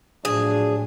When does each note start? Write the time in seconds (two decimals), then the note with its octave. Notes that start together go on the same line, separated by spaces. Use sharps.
0.25 A2 F3 F#3 D4 G#4